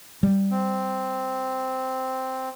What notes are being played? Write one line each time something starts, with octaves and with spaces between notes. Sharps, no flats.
G3
C4